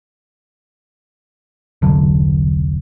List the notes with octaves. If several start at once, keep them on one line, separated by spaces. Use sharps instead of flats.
E1 C2 D3 F#3